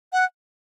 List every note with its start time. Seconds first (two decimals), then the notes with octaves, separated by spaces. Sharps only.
0.13 F#5